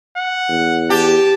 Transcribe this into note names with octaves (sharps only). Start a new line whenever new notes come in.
F#5
E2
G4 A5